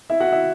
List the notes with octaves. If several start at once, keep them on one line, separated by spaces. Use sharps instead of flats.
E4 E5
F#4 F#5
E4 E5